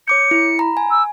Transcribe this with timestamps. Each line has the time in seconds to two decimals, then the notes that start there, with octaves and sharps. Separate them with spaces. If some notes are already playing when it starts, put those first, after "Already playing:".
0.08 C#5 D6 G6 C#7
0.31 E4
0.59 A#5 B5
0.77 G#5
0.91 E6